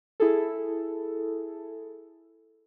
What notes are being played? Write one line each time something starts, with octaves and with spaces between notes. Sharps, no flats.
E4 G#4 A4